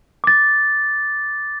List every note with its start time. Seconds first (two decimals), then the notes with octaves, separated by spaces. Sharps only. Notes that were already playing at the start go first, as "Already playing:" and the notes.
0.24 D6 A6